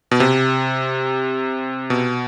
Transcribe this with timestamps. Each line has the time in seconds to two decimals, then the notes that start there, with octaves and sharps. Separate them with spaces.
0.11 B2
0.20 C3
1.90 B2